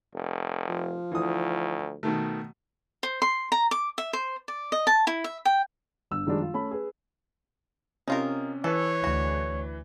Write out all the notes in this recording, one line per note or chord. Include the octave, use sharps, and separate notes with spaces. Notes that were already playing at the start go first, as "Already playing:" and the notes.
F1
F3
D2 E3 D#6
B2 D#3 A3
C5
C6
A#5
D6
E5
C5
D5
D#5
A5
E4
E5
G5
G1 E6
F#2 D#3 F3 G3 G#3 D4
F4
A3 C#4 A5 B5
G#4 B4
C3 C#4 D#4 F4 A#4
E3 A4 B4 C#5
D2 F#4